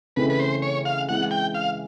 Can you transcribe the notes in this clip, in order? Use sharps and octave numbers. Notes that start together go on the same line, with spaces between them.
C#3 E3 A3 C4 D#4 B4
B4
C5
C#5
F5
E3 G#3 C4 F#5
G5
F5